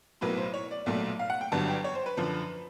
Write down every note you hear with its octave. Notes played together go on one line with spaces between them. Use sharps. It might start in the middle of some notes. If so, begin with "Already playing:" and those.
B1 A2 F#3 A#3 B4
C5
C#5
D5
B1 A#2 F#3 A3
F5
F#5
G5
G1 G2 D3 F#3 A5
G5
C#5
C5
B4
F#2 D3 F3